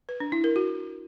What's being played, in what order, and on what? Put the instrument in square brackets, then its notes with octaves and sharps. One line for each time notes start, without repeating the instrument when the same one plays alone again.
[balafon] B4
D4
E4
A#4
F#4